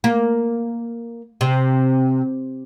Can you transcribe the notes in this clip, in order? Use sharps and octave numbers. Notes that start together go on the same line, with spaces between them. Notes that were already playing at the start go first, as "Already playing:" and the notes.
A#3
C3